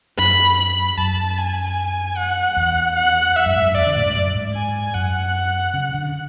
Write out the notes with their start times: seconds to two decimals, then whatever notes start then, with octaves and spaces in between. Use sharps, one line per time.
0.18 F#2 B5
0.58 B5
0.98 F#2 A5
1.38 G#5
2.17 F#5
2.57 E2
2.97 F#5
3.36 E5
3.46 F#2
3.56 G#2
3.66 F#2
3.75 E2 D5
3.86 D3
3.96 A2
4.06 G#2
4.16 F#2
4.35 G#2
4.55 G#5
4.95 F#2 F#5
5.74 C#3
5.94 D3